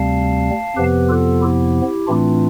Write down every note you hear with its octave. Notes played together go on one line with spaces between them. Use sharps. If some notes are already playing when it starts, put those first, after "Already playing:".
Already playing: D2 C3 G3 C4 F5 A5
F2 C3 F3 B3 G4 B4
F4 A4
E4 G4
A2 E3 A3 C4 D4 F4